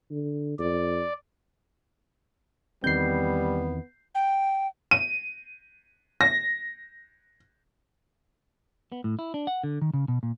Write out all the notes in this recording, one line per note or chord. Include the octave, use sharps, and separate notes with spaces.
D3
F2 D5
E2 D#3 G3 B3 C4 G6 C7
G5
D#7
A#6
B3
A2
E4
D4
F#5
D3
D#3
C#3
B2
A#2